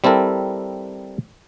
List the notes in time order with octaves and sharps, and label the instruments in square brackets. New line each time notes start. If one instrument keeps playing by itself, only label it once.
[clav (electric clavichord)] G3 C4 E4 A4 A#4